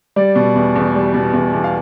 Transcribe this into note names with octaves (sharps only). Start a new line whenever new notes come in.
G3 D5
B2
E2
E2
G3
B2
E2
E2
F5